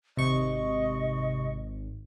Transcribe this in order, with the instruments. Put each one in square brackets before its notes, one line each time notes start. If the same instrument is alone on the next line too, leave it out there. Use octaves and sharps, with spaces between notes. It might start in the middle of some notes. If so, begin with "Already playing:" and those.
[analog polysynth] G#1 [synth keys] C3 C#6 [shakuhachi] D#5